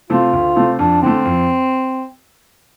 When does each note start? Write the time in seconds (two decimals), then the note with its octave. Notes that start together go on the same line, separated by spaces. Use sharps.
0.10 C3 A3 C4 F4
0.33 D2
0.56 C3 A3 C4
0.79 F2 D4
1.02 D3 A3 C4
1.25 F2